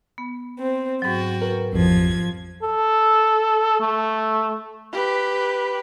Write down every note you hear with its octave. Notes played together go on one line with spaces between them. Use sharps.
B3
C4
G#2 F#3 F#4 G5
A#4 B4
A1 F2 F3 G#6
A4
A3
G4 B4